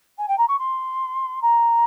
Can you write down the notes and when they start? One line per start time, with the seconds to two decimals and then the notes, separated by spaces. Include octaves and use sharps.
0.18 G#5
0.28 G5
0.38 A#5
0.48 C#6
0.58 C6
1.42 A#5